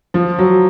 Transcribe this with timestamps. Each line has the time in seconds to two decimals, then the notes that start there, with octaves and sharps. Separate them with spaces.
0.14 F3
0.39 F#3